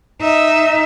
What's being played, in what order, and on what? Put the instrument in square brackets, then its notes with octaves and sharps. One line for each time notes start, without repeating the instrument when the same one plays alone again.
[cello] D#4 E5